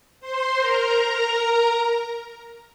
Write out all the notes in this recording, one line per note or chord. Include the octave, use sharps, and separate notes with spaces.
C5 C6
A#4 A#5